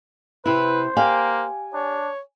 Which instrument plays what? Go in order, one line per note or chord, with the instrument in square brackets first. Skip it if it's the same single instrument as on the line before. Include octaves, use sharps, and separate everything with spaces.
[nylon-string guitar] C3 E4 [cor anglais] B4 [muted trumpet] C5
[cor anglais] A#3 [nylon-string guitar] G4 D5 F5 [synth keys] G#5
[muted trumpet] D4 [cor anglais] C#5